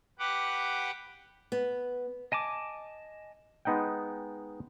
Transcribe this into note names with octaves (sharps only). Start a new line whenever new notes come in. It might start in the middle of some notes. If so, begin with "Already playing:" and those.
G4 B4 F#5 D6
B3
D#5 G#5 A5 D6
G#3 B3 D#4 F#5 G5